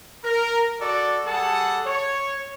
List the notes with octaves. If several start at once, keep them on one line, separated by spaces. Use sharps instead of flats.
A#4
F#4 A4 D5
G3 G#4 A4 F#5 A5
C#5